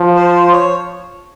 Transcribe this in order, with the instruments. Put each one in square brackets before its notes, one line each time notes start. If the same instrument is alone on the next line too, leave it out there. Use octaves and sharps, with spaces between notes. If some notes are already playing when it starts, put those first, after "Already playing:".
Already playing: [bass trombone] F3
[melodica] C5
C#5